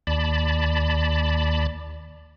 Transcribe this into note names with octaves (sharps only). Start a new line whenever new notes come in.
D#2 D5 A5 B5